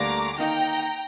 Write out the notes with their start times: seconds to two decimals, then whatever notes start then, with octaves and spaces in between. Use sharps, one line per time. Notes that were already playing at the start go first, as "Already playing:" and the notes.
Already playing: D2 D3 G3 A#3 D4 A#5 D6
0.38 D#3 A#3 D#4 G5 A#5